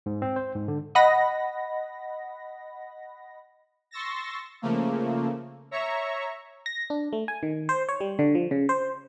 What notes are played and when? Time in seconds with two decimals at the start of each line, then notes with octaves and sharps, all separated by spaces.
0.06 G#2
0.22 C4
0.36 C5
0.55 G#2
0.68 D3
0.95 D#5 F#5 B5 A#6
3.91 C6 C#6 E6 A6 A#6
4.62 C#3 F3 A3 A#3
5.71 C#5 E5 A#5 C#6
6.66 A#6
6.90 D4
7.13 A3
7.28 G#5
7.43 D#3
7.69 C5
7.89 C#5
8.01 G3
8.19 D3
8.35 F3
8.51 C#3
8.69 C5